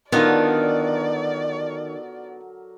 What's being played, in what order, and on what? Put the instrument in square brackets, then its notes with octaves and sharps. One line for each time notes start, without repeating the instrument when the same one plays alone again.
[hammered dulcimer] D3 F#3 A#4 [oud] D#3 [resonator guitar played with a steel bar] B3 D#4 F4 [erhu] D5